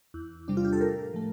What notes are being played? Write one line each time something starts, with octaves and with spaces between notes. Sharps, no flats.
E2
C3 G3 D4
F4
G4
A4
A2 A#4
F3 A3